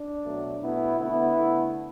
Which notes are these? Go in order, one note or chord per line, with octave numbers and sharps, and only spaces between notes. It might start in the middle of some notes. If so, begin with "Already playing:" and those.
Already playing: D4
B2 F#3 A3
B2 A3 B3 E4
D3 A3 B3 E4
D3 A3